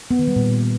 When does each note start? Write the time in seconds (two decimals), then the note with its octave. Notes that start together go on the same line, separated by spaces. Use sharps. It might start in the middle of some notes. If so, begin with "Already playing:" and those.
0.11 B3
0.19 D#3
0.28 G3
0.36 A#2